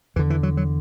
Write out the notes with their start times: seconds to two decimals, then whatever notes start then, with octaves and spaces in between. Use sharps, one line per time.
0.16 E2 E3
0.19 D3
0.30 E3
0.43 F#3
0.57 F#3